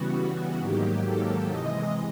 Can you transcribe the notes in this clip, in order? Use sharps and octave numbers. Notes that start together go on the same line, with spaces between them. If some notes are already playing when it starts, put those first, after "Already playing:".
Already playing: C#3 E3 G3 B3 F#4
F#4
G#2 D#3 F#3 A#3 G4
A4
C3 E3 G#3 D#5